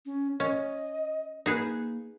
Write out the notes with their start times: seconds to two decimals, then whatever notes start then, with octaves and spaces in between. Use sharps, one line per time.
0.06 C#4
0.40 C#4 D#5
1.46 A#3 D#4 G#4 B4